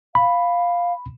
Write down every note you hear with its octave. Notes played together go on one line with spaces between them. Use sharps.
F5 B5